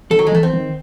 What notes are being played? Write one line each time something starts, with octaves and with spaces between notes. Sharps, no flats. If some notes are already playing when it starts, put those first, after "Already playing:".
D#3 A4
F#3
G#3
E3 A3
C4
D#3